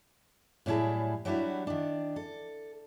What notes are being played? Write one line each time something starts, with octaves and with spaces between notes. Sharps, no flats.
A2 F#3 G3 E4 G#4 A5
F#3 G3 D4 E4 F#4
D#3 D4
A4